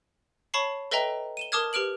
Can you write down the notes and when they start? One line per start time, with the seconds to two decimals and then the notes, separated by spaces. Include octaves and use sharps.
0.54 C#5 A5 B5 C#6 C7
0.91 A4 B4 D#5 E5 G5 A#5
1.37 D#7 E7 G7
1.52 A#4 A5 D6 D#6 F6 G#6
1.73 G4 B4 F6 D7 F#7